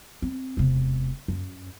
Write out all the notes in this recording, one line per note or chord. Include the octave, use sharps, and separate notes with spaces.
C4
E1 C3
F#2